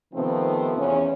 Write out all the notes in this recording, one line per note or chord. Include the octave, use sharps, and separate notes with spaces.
C3 D#3 F3 A3 B3 C4
E2 C#4